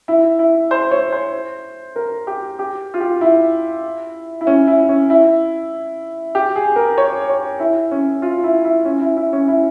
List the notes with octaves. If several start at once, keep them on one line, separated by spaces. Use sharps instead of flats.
E4
E4
C5
C#5
C5
A#4
G4
G4
F4
G4
E4
E4
C#4
E4
C#4
E4
G4
G#4
A#4
C#5
C#5
E4
C#4
F4
E4
E4
C#4
E4
E4
C#4
E4